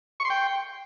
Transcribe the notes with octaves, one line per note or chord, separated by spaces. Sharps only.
C#6
C6
G5